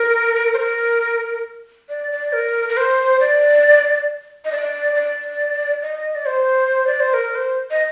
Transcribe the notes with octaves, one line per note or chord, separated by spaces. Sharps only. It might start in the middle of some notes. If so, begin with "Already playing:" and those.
Already playing: A#4
C5
A#4
D5
D5
A#4
A#4
C5
D5
D#5
D5
D5
D#5
D5
C5
D5
C5
A#4
C5
D#5